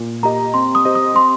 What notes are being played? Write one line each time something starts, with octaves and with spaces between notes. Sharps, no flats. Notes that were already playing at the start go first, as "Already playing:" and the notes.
Already playing: A#2
A#3 G4 D#5 A#5
C4 C6
D#6
G4 C5 D#5
D#6
C4 C6